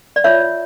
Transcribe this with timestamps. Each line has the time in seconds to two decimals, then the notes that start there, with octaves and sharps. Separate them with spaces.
0.16 D5
0.24 F4 C#5 E5